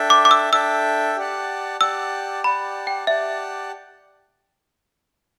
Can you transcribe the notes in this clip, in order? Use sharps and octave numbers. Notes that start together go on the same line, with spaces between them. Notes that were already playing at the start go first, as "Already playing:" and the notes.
Already playing: D4 A4 E5 G5
D6
D6
E6
D4 A4 E5 G5 E6
G4 D5 F#5 A5
G4 D5 F#5 A5 E6
G4 D5 F#5 A5 B5
G5
G4 D5 E5 F#5 A5